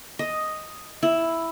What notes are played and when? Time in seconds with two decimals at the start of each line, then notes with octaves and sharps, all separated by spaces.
0.19 D#5
1.03 E4